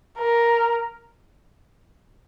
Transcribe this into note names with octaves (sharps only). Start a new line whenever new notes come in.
A#4